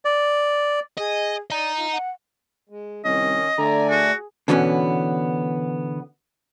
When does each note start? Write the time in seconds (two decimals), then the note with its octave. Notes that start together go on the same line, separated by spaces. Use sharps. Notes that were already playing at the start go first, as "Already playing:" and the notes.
0.05 D5
0.98 G#4 D#5
1.50 D5 D#5 A#5
1.77 F4
1.92 F#5
2.69 G#3
3.05 C2 D#3 C#4 D#5
3.58 D3 A3 D5 G#5 A#5
3.90 F#4 G#4
4.48 B2 D3 E3 B3 C#4